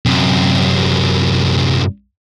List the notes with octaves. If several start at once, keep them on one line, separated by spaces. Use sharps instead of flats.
F#2 C3